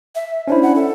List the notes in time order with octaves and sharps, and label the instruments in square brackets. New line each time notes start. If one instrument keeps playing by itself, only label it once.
[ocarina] E5
[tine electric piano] C#4 D4 E4 [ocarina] C5
[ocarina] F#5
A4